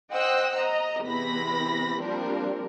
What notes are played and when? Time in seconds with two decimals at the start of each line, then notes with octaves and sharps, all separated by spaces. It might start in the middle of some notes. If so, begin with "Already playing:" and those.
0.13 C5 D#5 F#5 G5 E6 F#6
0.59 D#5 A#5
1.03 E2 C3 E3 B3 B5 A#6
2.01 F3 G3 A#3 C4 D4 A#4